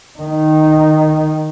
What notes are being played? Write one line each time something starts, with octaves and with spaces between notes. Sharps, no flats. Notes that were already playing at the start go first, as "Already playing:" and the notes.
D#3 D#4